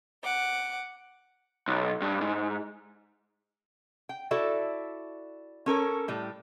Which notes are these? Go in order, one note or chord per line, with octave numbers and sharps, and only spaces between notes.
F#5 D6
B1
G2
G#2
G5
E4 F#4 A4 D5 E5
C#4 A4 A#4 C#5
A2 G3